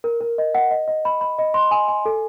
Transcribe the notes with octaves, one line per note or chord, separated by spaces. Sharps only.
A#4
A#4
D#5
F#5
D#5
D#5
B5
B5
D#5
C6
G#5
G#5
A4